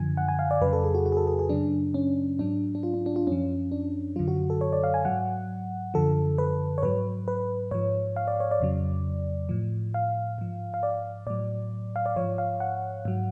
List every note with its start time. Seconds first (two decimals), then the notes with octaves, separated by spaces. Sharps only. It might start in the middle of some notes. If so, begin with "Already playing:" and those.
Already playing: F#2 D3 F3 G#5
0.17 F#5
0.29 G#5
0.39 F5
0.51 D5
0.61 F2 C#3 F#3 B4
0.73 A4
0.84 G#4
0.95 F#4
1.06 F#4
1.12 G#4
1.17 A4
1.27 G#4
1.39 G#4
1.49 F#2 C#3 F#3 D4
1.94 C#4
2.39 G#2 F#3 D4
2.75 D4
2.83 F4
2.94 D4
3.06 D4
3.16 F4
3.27 F#2 F3 C#4
3.72 D4
4.16 F#2 D3 F#3 F4
4.28 F#4
4.50 A4
4.61 C#5
4.73 D5
4.84 F5
4.94 G#5
5.05 G#2 F#3 F#5
5.94 F#2 D3 F3 A4
6.38 B4
6.78 C#5
6.83 G#2 F#3 B4
7.28 B4
7.71 G#2 F3 C#5
8.16 F5
8.28 D5
8.40 C#5
8.51 D5
8.60 F2 C#3 F#3
9.49 A2 F3
9.94 F5
10.38 G#2 F3
10.74 F5
10.83 D5
11.27 A2 F#3 D5
11.96 F5
12.06 D5
12.16 G#2 F3 C#5
12.38 F5
12.60 F#5
13.05 G#2 F#3